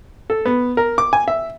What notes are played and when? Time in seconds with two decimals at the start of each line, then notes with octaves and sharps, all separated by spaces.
0.30 A4
0.45 B3
0.77 A#4
0.98 D6
1.13 G#5
1.28 E5